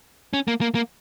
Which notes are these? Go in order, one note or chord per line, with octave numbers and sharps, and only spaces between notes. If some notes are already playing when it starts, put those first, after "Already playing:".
C#4
A#3
A#3
A#3